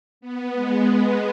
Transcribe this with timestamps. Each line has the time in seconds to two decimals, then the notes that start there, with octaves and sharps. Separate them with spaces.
0.21 B3
0.54 G#3